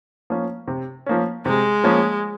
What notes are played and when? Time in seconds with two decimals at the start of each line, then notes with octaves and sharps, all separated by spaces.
0.30 F3 A#3 C#4
0.68 C3
1.06 F3 A#3 C#4
1.46 C3 G#3
1.84 F3 A#3 C#4